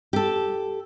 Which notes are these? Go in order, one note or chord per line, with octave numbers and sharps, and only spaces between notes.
G4 A4